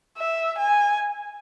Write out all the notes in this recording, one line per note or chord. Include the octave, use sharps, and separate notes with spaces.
E5
G#5